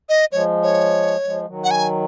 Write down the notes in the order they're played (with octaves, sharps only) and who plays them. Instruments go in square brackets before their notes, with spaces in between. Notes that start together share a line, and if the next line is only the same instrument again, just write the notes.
[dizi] D#5
[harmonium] F3 G#3 [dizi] C#5
[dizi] C#5
[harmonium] F3 G#3
D#3 F#3
[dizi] F#5
G#5